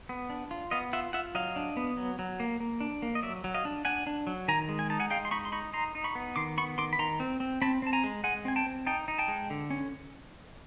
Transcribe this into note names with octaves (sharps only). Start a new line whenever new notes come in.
B3
D4
F4
B3 D#5 F5
F4 E5 F#5
F4 E5 F#5
F#3 D#5 F5
D4
B3
F#3
F#3
A#3
A#3
D4
A#3
D#5
F#3 D5 E5
F#3
D#5 F5
D4
D4 F#5 G#5
D4
F#3
D#3 G#5 A#5
G#3
G#5
D#4 A5
F#5 G#5
G#3 F5 G5
C6
D#4 B5 C#6
C6
D#4 B5 C#6
D#4 A#5 C6
D#4
B5 C#6
B3
D#3 C6 D6
B3 B5 C#6
D#3 C6 D6
B5
D#3 A#5 C6
C4
C4
C4 A5 B5
C4 A5
G#5 A#5
G#3
G#3 F#5 G#5
C4 G#5
G5 A5
C4
D#4 G5 A5
D#4
G5 A5
G#3
D3
C#4